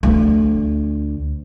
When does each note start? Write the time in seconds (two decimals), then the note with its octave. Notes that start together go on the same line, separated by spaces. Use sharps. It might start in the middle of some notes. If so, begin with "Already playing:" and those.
0.03 D2